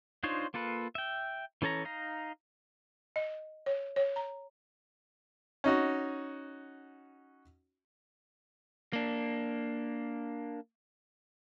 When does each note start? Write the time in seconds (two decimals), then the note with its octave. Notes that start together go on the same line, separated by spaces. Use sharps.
0.23 D4 D#4 F4 C5 C#5
0.54 A#3 F4 A4 B4
0.95 E5 G5
1.62 E3 C#4 A4 C#5 A#5
1.85 D#4 F5 A#5
3.16 D#5
3.66 C#5
3.96 C#5
4.16 A#5
5.64 C#4 D#4 F#4
8.93 A#3 D4